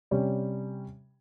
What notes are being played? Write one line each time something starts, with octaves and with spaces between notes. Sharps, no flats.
C3 G3 C#4 G4 C#5